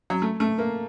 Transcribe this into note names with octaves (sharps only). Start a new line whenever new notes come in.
F#3
A3
A3
A#3